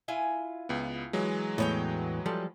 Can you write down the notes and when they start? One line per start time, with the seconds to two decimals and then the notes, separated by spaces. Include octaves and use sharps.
0.08 E4 F4 G#5
0.69 C#2 B3
1.13 E3 F#3 G#3
1.58 E2 A2 B3 C#5 G5
2.26 F3 G3 A4